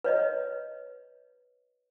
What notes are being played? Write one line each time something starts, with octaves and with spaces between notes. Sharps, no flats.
B4 C#5 D#5